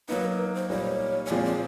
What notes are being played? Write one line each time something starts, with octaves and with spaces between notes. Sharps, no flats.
F#3 A#3 D#4 B4
A#4
B4
C5
A#2 G3 A#3 D#4 C#5
C#5
A#2 F3 G#3 C4 D5
D5